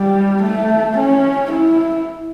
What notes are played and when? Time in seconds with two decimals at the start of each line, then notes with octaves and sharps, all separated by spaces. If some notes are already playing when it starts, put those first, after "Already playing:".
Already playing: G3
0.43 A3
0.98 C#4
1.52 E4